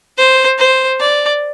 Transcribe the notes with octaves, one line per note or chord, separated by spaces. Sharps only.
C5
C5
D5